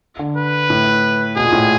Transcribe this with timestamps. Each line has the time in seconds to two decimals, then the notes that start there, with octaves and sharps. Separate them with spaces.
0.19 D3
0.37 B4
0.70 A2
1.36 B2 G#4
1.44 A#2
1.52 A2